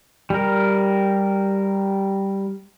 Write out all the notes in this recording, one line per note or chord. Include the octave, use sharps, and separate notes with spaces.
G3 A#4